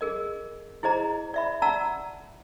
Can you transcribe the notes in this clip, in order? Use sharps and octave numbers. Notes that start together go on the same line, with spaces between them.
G#4 A#4 D#5
E4 G#4 C5 D#5 A#5
D5 E5 B5
D5 F#5 A5 A#5 E6